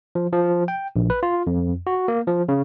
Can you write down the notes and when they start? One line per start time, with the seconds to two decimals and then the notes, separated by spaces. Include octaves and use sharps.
0.15 F3
0.32 F3
0.68 G5
0.96 A#1
1.10 B4
1.23 F4
1.47 F2
1.87 F#4
2.08 A#3
2.27 F3
2.49 C#3